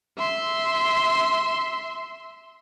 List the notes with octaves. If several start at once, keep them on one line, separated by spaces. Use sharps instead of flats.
E5 C6